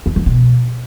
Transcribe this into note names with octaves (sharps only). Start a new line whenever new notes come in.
F2
F2
B2